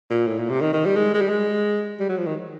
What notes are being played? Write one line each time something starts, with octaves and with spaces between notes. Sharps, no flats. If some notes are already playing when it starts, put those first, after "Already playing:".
A#2
A2
A#2
C3
D#3
D#3
G3
G#3
G#3
G3
G#3
G3
F#3
F3
D#3